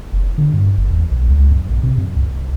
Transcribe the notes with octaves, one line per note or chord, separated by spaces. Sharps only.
F#1
D3
G2
G1
E2
B1
C#2
F#2
A#1
C3
F#2
C2